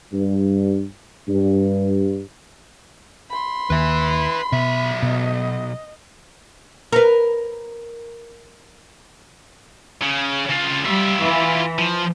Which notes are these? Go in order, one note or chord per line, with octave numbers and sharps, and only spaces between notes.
G2
G2
B5 C6
D#2 B4 E5
B1 B2 E5
B2 D#5
A#4 B4
C#3
C#3 F4
G3 F4 E5
E3
F3